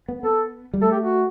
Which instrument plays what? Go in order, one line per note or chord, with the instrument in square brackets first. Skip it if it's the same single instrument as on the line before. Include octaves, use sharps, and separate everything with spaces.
[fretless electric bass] B3
[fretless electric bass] B3 [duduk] A4
[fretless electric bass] G3
[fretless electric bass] A3 [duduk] A4
[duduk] G4
F#4